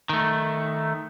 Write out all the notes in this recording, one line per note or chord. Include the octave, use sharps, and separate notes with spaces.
D#3 A3